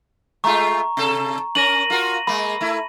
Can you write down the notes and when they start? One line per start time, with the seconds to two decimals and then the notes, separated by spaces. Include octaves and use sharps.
0.44 G#3 A3 F4 A#5 C#6
0.97 C3 A4
1.55 C#4 A#4 A#6 D#7 F#7
1.90 F4 F#4 A#4
2.27 G#3 A#3 B5
2.61 A3 E4